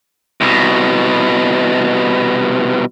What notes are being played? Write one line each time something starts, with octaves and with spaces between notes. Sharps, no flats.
C2 B2